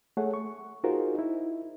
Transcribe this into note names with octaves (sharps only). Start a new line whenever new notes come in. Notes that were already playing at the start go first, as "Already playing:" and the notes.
A3 G#4 C#5 F#5
C#6
D#4 F4 F#4 G#4 A#4 C5
D#4 E4